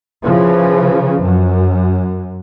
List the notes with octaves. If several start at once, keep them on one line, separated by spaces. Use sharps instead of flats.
C#3 E3 F3
F#2